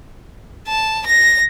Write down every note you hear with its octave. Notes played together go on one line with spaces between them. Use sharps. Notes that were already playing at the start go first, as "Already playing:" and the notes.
A5
A#6